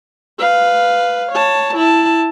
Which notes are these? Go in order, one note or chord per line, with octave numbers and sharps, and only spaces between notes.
B4 F5
C#5 A5
E4 A5